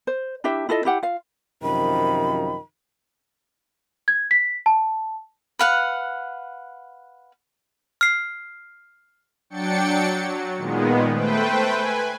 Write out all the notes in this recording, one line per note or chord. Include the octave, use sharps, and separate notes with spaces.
C5
D4 E4 G4 E5
E4 F4 A4 D#5
E4 G4 F#5
F4 F5
F#2 C3 D#3 F3 B5
G#6
B6
A5
B4 F5 F#5
F6 C7
F#3 D4 G5 A6 C#7
F#3
A#2 D#3 G#3 B3
A3 B4 C5 G5
B4 G#5